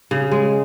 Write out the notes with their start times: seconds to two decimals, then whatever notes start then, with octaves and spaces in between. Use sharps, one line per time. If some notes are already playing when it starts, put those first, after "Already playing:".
0.11 C#3
0.32 G#3